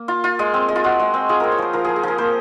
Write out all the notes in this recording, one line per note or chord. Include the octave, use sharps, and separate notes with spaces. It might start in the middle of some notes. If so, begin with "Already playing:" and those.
Already playing: A#3
F4
F4
G#3
C4
G#3
F4
G#3 F#4
G#3
C4
F4 G#4
C4 A#4
C#5
F3 C5
F3 A#4
F3 G#4
G#4
F3 A#4
A#3 C5